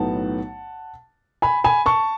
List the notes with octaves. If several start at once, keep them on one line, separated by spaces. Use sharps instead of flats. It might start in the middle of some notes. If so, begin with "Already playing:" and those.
Already playing: B1 A2 F#3 B3 D#4 F#5 A5
G#5 B5
G#5 B5
A5 C#6